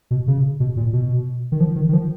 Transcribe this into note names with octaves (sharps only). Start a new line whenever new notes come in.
B2
C#3
B2
A#2
B2
D#3
F3
D#3
D#3
F3